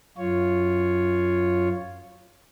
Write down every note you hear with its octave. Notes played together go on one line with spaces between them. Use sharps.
F#2 F4 C#5